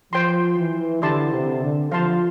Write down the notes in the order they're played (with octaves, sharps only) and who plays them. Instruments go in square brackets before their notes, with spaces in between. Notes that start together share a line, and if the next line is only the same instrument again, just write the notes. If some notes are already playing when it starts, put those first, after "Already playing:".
[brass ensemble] F3 [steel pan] C5 G5 C6
[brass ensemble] E3
[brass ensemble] D3 [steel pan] E4 G4 D5 A5 C6
[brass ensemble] C3
D3
[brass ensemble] F3 [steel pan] C5 F5 A5 C6